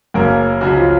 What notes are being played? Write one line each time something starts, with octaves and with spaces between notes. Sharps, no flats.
F#1 F#2 C#3 A#3 A#4
C#2 C#3 F#3 F#4
F3 F4